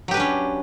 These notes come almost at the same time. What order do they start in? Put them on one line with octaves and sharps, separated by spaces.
F#3 G4 B4 D4 C#4